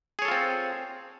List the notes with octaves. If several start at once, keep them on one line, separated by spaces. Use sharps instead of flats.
C4 F4 G#4 A4 C#5